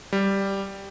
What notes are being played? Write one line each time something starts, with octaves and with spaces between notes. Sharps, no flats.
G3